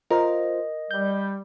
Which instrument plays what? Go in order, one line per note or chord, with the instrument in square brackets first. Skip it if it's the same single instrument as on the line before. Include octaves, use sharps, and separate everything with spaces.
[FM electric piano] F4 C5 [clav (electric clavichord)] A#4 [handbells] D#5
[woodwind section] G3 [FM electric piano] G6